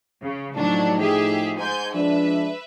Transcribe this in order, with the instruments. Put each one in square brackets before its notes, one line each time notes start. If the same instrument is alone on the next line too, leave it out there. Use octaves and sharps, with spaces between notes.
[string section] C#3
[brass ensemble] A2 F3 D#4 [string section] F#3 D4
[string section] G4 G#4 E5
G#2 G#5 G6
[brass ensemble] F3 G#3 D4 [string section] B4 E5